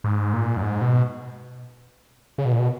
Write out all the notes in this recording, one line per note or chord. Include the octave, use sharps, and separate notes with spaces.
G#2
A#2
F#2
G#2
B2
C#3
B2
A#2
B2